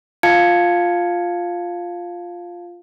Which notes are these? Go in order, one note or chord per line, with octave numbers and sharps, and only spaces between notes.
F4 F5 A5 G#6 C#7